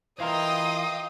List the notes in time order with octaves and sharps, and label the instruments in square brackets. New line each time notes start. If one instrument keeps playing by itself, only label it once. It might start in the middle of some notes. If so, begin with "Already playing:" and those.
[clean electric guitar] E3 F4 A#4 [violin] D#5 G5 [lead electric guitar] F5 [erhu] D#6